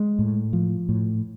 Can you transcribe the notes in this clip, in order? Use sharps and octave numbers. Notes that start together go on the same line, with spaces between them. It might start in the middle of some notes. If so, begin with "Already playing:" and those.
Already playing: G#3
A2
F3
A2